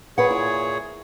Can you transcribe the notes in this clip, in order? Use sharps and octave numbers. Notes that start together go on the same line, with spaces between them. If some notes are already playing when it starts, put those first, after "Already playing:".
A#2 G#4 B4 C#5 F#5
E4